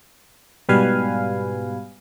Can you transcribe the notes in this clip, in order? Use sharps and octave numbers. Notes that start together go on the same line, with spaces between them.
G#2 B2 G3 B4 F5 G#5